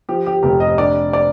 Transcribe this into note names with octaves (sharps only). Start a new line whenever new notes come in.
F3 G4
G4
F1 G4
D#5
D4 D5
D5